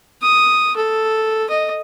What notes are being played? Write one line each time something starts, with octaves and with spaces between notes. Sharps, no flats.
D#6
A4
D#5